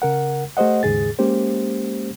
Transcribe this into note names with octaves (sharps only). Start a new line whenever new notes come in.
C#3 A#4 F#5
A3 G4 C5 D#5 F#5
D#2 G#2 C#3 G#4 A6
G#3 A#3 C#4 G4 C5